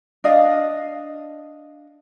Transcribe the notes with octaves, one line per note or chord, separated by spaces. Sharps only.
D4 D#5 F5